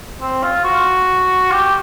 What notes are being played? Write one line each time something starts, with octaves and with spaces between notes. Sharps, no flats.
C4
F4
F#4
G4